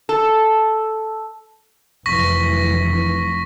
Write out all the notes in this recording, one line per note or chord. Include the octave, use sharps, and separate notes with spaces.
A4
F1 F#2 E3 C#6 A#6 B6